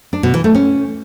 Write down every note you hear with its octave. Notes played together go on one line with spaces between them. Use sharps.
D4
B2
E3
A3
C#4